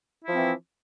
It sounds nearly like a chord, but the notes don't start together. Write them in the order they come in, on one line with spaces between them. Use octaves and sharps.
E4 F3 C4 E3